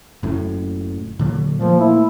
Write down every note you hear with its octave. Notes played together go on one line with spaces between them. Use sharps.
F#1 F#2 A2
A#2 D3 F#3
A#2 F3 A3 A#3
E4